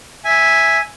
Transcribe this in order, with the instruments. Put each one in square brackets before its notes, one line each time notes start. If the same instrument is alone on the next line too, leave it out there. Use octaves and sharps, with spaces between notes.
[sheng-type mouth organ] E5 G#5